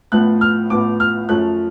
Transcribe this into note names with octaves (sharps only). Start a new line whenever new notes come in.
A1 A2 F3 B3 F#6
F6
A1 A2 F3 B3 D6
F6
F#2 F3 A3 C#4 F#6